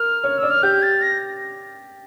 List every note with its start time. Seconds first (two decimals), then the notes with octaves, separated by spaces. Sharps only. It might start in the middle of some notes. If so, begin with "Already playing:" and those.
Already playing: A#4 F6
0.24 C#5
0.37 E6
0.43 D5
0.50 F6
0.63 G4 G6
0.82 A6
1.01 A#6